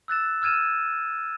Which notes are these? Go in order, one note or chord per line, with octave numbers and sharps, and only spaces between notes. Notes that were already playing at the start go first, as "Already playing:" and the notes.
E6 F#6 A6 E7
E6 F6 G#6 D#7 E7